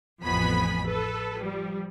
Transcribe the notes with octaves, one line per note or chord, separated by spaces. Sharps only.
A1 F2 B3 G#5 B5 B6
A4 B4
F3 G3